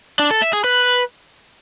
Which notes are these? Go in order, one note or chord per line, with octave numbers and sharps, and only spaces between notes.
D4
A4
E5
G#4
B4